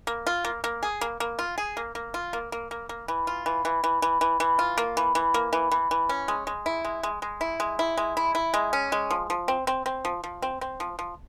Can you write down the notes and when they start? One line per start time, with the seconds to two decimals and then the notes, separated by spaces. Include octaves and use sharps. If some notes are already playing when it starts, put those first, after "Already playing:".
0.07 A#3
0.27 F4
0.45 A#3
0.64 A#3
0.83 G#4
1.01 A#3
1.20 A#3
1.39 F4
1.58 G#4
1.77 A#3
1.95 A#3
2.14 F4
2.33 A#3
2.52 A#3
2.71 A#3
2.89 A#3
3.08 E3
3.27 F4
3.46 E3
3.65 E3
3.84 E3
4.02 E3
4.21 E3
4.40 E3
4.59 F4
4.78 A#3
4.97 E3
5.15 E3
5.34 A#3
5.53 E3
5.71 E3
5.91 E3
6.09 C#4
6.28 G#3
6.47 G#3
6.66 E4
6.85 G#3
7.03 G#3
7.22 G#3
7.41 E4
7.60 G#3
7.79 E4
7.97 G#3
8.17 E4
8.35 E4
8.54 G#3
8.73 C#4
8.92 G#3
9.11 F3
9.30 F3
9.48 C4
9.67 C4
9.86 C4
10.05 F3
10.24 F3
10.42 C4
10.61 C4
10.80 F3
10.99 F3